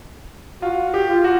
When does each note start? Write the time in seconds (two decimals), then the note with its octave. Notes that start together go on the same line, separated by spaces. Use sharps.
0.62 F4 F#4
0.94 G4
1.09 F4
1.24 F#4